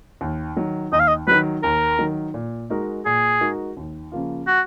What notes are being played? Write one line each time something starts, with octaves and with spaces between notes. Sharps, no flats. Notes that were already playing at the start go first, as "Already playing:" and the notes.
D#2
D#3 F#3
D#2 D#5
F5
D#5
D#3 F#3 B4
D#2 A#4
D#3 F#3
A#2
G#3 D#4 F#4 A#4
A#2 G#4
G#3 D#4 F#4 A#4
D#2
C#3 F3 A#3 F4
F#4